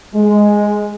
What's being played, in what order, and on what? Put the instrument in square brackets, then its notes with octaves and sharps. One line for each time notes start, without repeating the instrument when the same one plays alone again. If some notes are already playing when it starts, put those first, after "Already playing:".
[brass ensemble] G#3